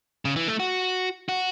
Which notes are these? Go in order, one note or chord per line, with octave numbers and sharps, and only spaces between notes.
C#3
E3
A3
F#4
F#4